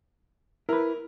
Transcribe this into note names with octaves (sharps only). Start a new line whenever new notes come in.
E4 A#4 B4